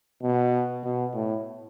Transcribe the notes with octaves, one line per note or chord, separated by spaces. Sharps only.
B2
B2
A2